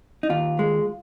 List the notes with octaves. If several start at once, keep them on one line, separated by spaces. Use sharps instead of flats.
D#4
D#2 F4
G#3